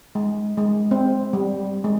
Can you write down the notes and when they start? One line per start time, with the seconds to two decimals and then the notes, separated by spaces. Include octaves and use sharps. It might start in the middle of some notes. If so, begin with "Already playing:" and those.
0.15 G#3
0.58 G#3
0.91 C4
1.33 G3
1.84 G#3